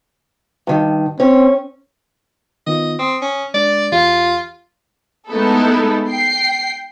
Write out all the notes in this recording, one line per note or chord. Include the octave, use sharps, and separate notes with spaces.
G2 D#3
C4 C#4 C#5
D#3 B3 F4 D#5
C4 D#6
C#4
G#3 D4 D5
E2 F4 G4
G#3 A3 B3 D#4 E4 A4
G5 C7